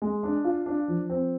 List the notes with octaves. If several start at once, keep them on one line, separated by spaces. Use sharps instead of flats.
G#3
D4
F4
D4
F3
C4